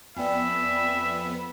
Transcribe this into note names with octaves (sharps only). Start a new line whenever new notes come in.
F2 B3 D5 E5 G5 G#5 B5